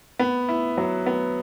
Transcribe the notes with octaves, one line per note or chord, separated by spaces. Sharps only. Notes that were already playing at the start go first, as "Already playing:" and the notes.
B3
E4
F#3
B3